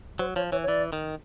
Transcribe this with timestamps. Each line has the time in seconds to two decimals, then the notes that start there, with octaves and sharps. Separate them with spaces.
0.19 F#3 C5
0.36 F3 C#5
0.52 E3 C#5
0.63 C#5
0.68 E3 D5
0.93 D#3